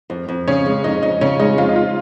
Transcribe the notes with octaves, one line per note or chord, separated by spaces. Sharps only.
F2
F2
C#3 C#4
G#3
F2 D#4
F2 D#4
C#3 C#4
G#3 D#4
F2 F4
D#4
F4